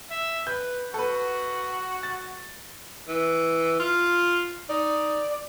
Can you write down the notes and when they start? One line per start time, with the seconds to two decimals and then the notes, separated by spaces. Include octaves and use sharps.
0.10 E5
0.47 B4 G6
0.94 F#4 A4 B4
2.03 A6
3.08 E3
3.80 F4
4.69 D#4 D5